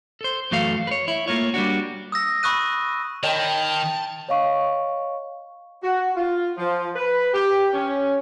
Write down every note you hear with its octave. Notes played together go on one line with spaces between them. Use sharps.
A4 C5
F#2 E3 A3 F#4 A4 F5
B4 C#5
E4
A3 A#3 F4 C#5
G3 A#3 D4 F#4
D#6 E6 A#6
B5 C#6 D#6 F#6 D#7
D#3 C#5 D#5 G5 A5 B5
C#5 D#5 F5 C#6
F#4
F4
F3
B4
G4
C#4